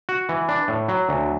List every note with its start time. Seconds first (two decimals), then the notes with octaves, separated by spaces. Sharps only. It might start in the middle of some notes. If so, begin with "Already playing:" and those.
0.09 F#4
0.29 E3
0.49 D4
0.68 A2
0.89 F#3
1.09 D2